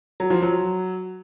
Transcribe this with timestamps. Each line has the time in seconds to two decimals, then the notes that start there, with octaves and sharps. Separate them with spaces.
0.20 F#3
0.30 F3
0.42 F#3